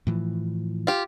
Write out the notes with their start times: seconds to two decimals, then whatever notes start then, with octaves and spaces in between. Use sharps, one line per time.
0.07 A2 E3 F3
0.87 F4 G4